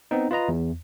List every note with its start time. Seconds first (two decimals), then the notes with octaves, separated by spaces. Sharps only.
0.11 B3 C4 D#4
0.31 F4 B4 D#5 A#5
0.48 E2